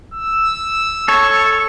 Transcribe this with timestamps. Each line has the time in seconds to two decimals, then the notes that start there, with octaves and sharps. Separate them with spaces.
0.14 E6
1.08 A4 C#5 C#6